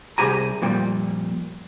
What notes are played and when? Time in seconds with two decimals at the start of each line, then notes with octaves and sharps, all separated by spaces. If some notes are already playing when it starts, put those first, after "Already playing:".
0.18 C2 G4 G#4 G#5 A#5
0.62 F2 A#2 G3